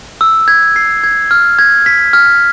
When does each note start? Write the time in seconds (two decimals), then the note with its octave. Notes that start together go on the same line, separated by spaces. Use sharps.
0.21 E6
0.48 G#6
0.76 C7
1.04 G#6
1.31 F6
1.59 G#6
1.86 B6
2.13 F6